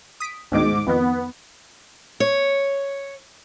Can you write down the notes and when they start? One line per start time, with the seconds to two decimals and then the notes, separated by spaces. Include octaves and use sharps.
0.20 D#6 B6 D7
0.52 D2 G#2 B2 D#3 D6
0.87 F2 D#3 B3
2.20 C#5